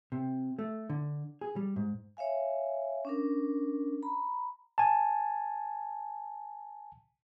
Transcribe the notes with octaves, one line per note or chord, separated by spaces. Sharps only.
C3
A3
D3
G#4
G3
G#2
C#5 E5 F5 G#5
C#4 D4 A#4
A#5 B5
G#5 A5